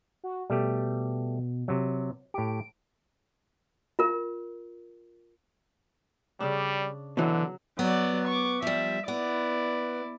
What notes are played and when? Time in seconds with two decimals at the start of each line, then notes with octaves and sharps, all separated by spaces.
0.24 F#4
0.50 B2 G3 A3 G4
1.68 C3 F#3
2.34 A2 G4 D7
3.99 F4 A#4
6.40 C#3 G3 D4
7.17 B2 D3 E3 F#3 F#5
7.79 F#3 B3 D5
8.28 C#6 D6
8.62 F3 G3 E5
9.08 B3 E4 D5